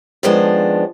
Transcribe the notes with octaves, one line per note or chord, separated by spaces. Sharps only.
F2 D#3 F3 G#3 B3 D4